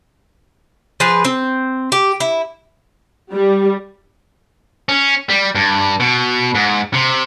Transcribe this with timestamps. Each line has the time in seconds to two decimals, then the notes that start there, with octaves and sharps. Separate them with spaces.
1.00 F3 G#4 B4
1.25 C4
1.92 G4
2.20 E4
3.33 G3
4.89 C#4
5.29 G3
5.55 G2
6.00 B2
6.55 G#2
6.94 C3